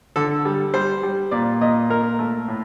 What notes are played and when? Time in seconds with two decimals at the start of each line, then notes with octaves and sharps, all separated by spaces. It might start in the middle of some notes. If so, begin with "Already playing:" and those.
0.16 D3 A4
0.45 G3
0.74 G3 C5
1.03 G3
1.31 A#2 D5
1.61 A#2 D#5
1.89 A#2 A#4
2.19 A3
2.48 A2